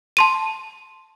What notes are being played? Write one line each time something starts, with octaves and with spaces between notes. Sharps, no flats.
A5 C6 D#7